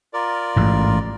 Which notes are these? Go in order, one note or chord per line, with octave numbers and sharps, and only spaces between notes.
F4 A#4 D5
A1 G#2